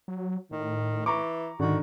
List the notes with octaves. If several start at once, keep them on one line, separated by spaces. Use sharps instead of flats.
F#3
A2 D#3
E3 A#5 C#6 D6
G#2 D3 D#3 F#4